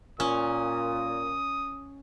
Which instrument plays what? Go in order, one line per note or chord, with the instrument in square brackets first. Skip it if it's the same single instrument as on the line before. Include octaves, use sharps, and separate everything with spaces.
[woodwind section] A#2 [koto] C#4 [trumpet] D#6